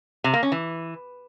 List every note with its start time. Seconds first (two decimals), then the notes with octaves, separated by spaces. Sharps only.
0.24 C3
0.33 A#3
0.43 C#4
0.52 E3